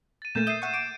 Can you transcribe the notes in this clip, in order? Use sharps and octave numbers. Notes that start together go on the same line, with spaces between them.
A6 D#7
A#2 A3 A#3 G6 E7
E5 D#6 G6 C7 D#7 E7
E5 F#5 C#6
D6 D7